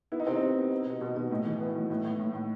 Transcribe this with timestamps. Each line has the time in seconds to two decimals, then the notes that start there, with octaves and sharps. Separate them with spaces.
0.12 B3 E4
0.20 D#4
0.27 C3 C4
0.35 D#4
0.42 C3
0.57 B3
0.71 B3
0.86 B2
1.01 B2
1.16 B2
1.31 A2
1.45 E3
1.61 B3
1.75 A2
1.90 A2
2.04 A2
2.19 A2
2.34 A2